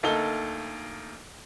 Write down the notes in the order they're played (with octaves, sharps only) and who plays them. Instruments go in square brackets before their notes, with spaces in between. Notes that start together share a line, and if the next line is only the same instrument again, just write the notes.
[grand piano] D2 A#3 D#4 A4 G7